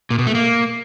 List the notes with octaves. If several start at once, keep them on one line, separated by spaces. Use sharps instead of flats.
A#2
B2
A3
A#3